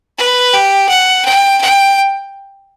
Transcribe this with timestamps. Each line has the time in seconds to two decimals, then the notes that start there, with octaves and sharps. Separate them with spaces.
0.18 B4
0.53 G4
0.89 F#5
1.25 G5
1.61 G5